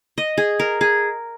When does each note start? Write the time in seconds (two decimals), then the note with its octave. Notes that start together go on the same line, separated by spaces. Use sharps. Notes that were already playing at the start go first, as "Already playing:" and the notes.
0.18 D#5
0.38 G#4
0.60 A#4
0.81 G#4